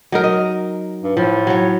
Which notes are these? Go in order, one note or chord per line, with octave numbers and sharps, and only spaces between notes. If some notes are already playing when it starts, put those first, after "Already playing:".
F#3 D#4 A#4
D#5
G2
A2 F3
F#3 C#5